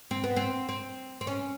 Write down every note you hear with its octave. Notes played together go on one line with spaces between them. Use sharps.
C4
B3
C4
C4
C4
C#4